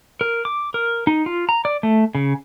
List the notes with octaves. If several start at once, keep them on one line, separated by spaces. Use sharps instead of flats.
A#4
D6
A#4
D#4
F4
A#5
D5
A3
C#3